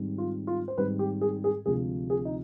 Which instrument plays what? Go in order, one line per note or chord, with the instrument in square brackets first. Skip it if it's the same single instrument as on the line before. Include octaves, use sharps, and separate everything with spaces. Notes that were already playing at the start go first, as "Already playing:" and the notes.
Already playing: [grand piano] G#2 D#3 G3 C4
F4
F4
C5
G#2 D#3 G3 C4 B4
G4
G#4
G#4
D2 C3 F3 G#3 G#4
G#4
D#4